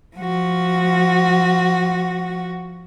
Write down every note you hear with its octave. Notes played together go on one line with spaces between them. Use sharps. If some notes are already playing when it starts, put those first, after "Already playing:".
F3 F#4